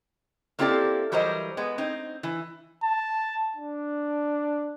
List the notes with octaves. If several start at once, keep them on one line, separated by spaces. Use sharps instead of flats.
A#3 C4 E4 G4 A4 D5
E3 F#3 G3 A#4 C5 D#5
G#3 B3
C4 D#4
E3
A5
D4